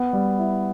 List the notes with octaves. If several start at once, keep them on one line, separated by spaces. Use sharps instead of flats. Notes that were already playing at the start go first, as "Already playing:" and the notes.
Already playing: B3
G3
E4